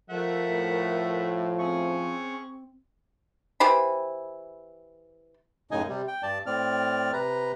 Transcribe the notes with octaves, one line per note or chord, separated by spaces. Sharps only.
F3 A3 A#4 E5 F#5
A2
C4 G#4 C#6
E3 G4 C5 B5
F#2 A2 C#3 D#4 D#5 G#5
C3 G3
G5
G2 D5 A5
A2 C4 D5 F6
C3 B4 A#5